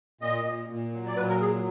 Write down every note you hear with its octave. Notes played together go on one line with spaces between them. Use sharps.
A#2 D#5
A#2
A#2
F#3
D5
A#2 B4
A#4
F#3 G#4